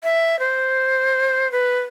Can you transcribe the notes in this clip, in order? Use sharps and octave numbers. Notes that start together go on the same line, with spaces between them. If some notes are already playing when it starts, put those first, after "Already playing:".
E5
C5
B4